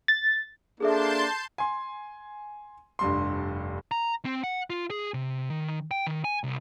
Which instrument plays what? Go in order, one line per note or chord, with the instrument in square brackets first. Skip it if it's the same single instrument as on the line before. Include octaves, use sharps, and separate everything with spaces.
[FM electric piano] A6
[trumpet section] A#3 D4 [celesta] G#4 A4 E5 [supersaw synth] A5 C6 G6
[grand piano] G#5 C6
F1 G2 C6
[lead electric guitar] A#5
C4
F#5
F4
G#4
C3
D#3
G5
D#3
G#5
C2